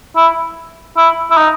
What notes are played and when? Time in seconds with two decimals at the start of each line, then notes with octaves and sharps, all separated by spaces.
0.16 E4
0.97 E4
1.31 E4
1.37 D#4